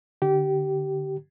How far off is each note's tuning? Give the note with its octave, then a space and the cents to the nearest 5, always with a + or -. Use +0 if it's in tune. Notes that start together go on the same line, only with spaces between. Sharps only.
D3 -5 G4 -20